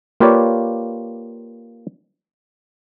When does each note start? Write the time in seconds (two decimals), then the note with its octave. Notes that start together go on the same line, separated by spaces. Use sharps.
0.20 A#3 F4 G4 B4 C#5 D5